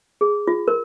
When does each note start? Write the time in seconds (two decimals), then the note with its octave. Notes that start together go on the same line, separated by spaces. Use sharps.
0.21 G#4
0.47 F4
0.68 A#4